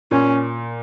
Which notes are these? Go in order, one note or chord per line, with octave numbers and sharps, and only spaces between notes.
A#2 C#4